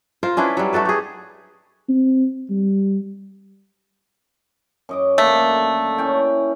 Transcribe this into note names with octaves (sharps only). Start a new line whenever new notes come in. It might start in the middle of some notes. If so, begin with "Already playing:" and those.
F4 A#4 C5
C#4 D4 E4 B4
F#3 G3
A3 F#4 A4 B4
G4 G#4
C4
G3
F#2 D#5 D6
D3 D#3 A3 A#3
C#4 E4 G5